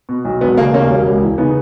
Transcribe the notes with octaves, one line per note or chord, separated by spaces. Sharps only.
B2
B1
E1 B3
C#3 A#3
D#2 A#3 C#4
E1
C#2
E3
C#3 B3 D#4